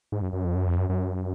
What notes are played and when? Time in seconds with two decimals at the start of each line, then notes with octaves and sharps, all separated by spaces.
0.12 G#2
0.22 F#2
0.33 F#2
0.45 F2
0.55 F#2
0.67 F2
0.78 F#2
0.89 F#2